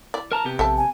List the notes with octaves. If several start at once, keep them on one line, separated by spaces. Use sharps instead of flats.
E4 D5
A#4 A5 A#5
C3 B3 G4
A#1 A4 E5 A5
G#5